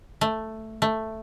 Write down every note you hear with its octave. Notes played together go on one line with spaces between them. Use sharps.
A3
A3